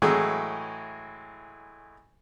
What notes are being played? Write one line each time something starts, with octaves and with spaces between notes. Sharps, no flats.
A2 E3 F#3 G#3